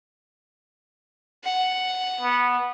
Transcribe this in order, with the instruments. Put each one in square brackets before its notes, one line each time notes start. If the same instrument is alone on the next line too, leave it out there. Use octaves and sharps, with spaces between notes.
[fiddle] F#5
[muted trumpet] B3